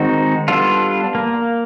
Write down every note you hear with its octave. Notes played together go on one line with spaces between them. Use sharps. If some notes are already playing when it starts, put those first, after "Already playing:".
Already playing: D#3 G#3 C4 D#4 F#4
G3 B3 D4 F4 A4
A#3